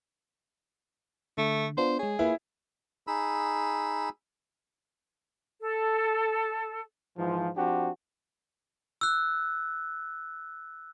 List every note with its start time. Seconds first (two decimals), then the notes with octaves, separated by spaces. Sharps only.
1.38 D3 A3
1.77 B3 D4 F4 C5
1.99 G#3 G#4 C#5
2.19 A#3 E4 F4 B4
3.07 D#4 G#4 B5 E6
5.61 A4
7.18 G#2 E3 F3
7.57 F3 C4 D4 F#4 G4
9.01 E6 F#6